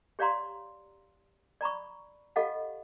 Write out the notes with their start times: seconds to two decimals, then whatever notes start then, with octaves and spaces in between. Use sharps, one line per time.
0.19 G4 C#5 D5 F5 A#5 C6
1.61 D5 A#5 B5 C#6
2.36 F4 G4 A4 D#5 F5 F#5